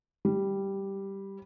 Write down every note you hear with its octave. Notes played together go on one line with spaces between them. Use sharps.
G3